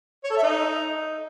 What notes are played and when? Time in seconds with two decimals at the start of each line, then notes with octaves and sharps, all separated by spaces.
0.24 C#5
0.30 A4
0.37 E5
0.43 D#4